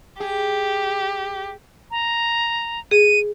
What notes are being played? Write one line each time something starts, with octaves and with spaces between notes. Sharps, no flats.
G4 G#4
A#5
G#4 D#7